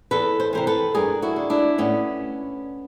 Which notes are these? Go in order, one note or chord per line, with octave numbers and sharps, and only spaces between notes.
E2 A4 B4
C5
C3 E3 A#4 C5
A4 B4
G2 G#4 A#4
E4 F#4
D3
D4 E4
A2 B3 C#4